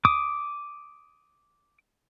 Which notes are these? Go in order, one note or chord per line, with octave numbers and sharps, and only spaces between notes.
D6 D#6